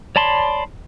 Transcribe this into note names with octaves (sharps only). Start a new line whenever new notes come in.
C#5 D5 A5 B5 C6